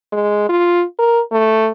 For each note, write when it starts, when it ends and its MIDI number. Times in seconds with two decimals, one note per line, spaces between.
0.13 0.45 56
0.49 0.84 65
0.99 1.21 70
1.32 1.70 57